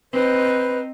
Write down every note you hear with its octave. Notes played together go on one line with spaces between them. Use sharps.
C4 D#4 B4 C5